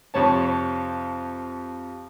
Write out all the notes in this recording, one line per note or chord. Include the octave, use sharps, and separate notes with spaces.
F2 C3 C#5 A5